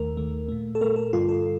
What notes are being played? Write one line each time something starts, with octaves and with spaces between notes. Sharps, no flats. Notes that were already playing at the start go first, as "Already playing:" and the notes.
Already playing: D#2 D#3 A3 A#4
D#2 D#3 A3
A#2 A3
A4
A#2 A3 A#4
A4
G2 D3 G3 F4
A4